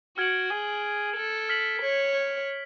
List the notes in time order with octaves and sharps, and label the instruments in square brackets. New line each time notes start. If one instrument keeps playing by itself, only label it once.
[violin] F#4 [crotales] F6 G#6 D7 F#7
[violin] G#4
A4
[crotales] F6 B6 F#7
[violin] C#5